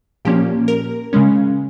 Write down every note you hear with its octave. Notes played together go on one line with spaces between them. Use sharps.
A#2 F3 A#3 C#4 G4
A#4
C#3 G#3 C#4